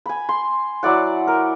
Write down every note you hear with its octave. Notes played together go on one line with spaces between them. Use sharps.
G#5 B5
C6
F#3 E4 D5 F#5
A#4